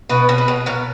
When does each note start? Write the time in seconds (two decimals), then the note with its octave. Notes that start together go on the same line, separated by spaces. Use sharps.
0.09 B2 B4
0.29 B2
0.38 B4
0.48 B2
0.66 B2 A#4